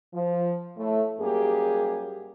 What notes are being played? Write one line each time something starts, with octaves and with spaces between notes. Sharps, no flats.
F3
A2 A3
F#2 G3 A#3 G4 G#4